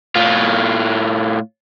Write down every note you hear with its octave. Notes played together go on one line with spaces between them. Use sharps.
A2 F4